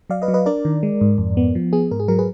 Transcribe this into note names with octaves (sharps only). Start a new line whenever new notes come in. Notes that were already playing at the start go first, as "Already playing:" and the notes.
F#3 D5 F5
B4 D#5
F#3
B4 D#5
D4 A#4 D5
D#3
G#3
G#2
F2
B3
F3
B3 G#4
G#2 A#4
G#4
F#3 A#4
G#4 B4